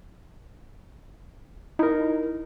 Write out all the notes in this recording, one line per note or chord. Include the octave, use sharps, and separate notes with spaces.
D#4 E4 A#4